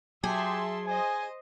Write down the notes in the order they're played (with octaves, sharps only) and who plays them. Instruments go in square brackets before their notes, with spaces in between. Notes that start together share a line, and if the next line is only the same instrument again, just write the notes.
[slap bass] F#3 [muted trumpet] G4 [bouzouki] G#4 [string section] E5 A5 C6
[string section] C5 D#5 [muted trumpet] G#5